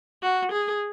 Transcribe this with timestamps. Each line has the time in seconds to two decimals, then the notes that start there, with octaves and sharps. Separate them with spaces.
0.23 F#4
0.52 G#4